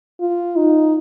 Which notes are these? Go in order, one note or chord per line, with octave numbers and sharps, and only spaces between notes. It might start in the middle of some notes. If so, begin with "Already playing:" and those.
F4
D#4